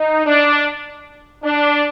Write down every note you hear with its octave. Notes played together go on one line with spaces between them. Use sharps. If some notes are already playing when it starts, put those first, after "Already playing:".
Already playing: D#4
D4
D4